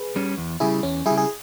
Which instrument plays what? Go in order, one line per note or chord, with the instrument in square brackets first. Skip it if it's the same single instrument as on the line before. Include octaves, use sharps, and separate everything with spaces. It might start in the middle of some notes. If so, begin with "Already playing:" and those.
Already playing: [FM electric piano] G#4 B4
[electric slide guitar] G3 C#4
E2
[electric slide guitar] C#3 G3 [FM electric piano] E4 G#4
[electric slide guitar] E2 [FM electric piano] C#4
[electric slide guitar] G3 [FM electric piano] E4 G#4
[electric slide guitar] C#3
[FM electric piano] G#4